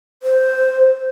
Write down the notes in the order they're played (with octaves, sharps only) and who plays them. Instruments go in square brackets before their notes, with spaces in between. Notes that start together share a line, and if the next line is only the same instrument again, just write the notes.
[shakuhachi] C5